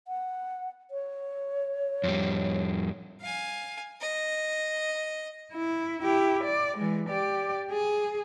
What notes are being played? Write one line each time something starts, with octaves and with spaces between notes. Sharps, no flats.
F#5
C#5
F2 G3
F5 G#5
D#5
E4
E4 G4
D5
E3 G#3
G4 D5
G#4